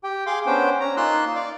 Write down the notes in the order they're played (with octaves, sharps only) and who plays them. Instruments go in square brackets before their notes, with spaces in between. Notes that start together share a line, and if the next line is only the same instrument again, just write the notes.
[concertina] G4 G5
G#4 F5 C6 D6
B3 C#4 D4 C5 G5
C#4 A#5
A#3 D#4 F4 C6 E6 F#6
D5 F5